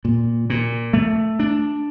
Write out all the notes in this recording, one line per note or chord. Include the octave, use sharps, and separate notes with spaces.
A#2
A#2
A3
D4